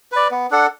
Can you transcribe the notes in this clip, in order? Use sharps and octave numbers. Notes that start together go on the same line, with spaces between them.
B4 D5
B3
D4 A4 F#5